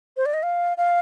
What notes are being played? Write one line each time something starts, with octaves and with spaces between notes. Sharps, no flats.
C5
D5
D#5
F5
F5